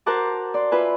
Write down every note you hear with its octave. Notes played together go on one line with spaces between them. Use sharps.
F#4 A#4 C5 F#5 A5 D6
D5 C6
F4 B4 E5 G#5